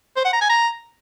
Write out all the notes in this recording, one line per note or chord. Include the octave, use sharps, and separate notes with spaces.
C5
F#5
A#5
G#5
A#5